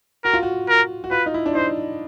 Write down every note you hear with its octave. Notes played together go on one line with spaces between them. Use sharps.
F#4 A#4
F4
F#4
A#4
F#4
F4 B4
D#4
E4
D4
D#4 C5